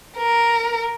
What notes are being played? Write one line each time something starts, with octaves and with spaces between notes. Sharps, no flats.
A#4